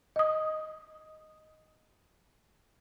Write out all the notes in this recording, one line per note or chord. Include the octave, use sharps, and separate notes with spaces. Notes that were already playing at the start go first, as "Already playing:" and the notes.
D#5 D#6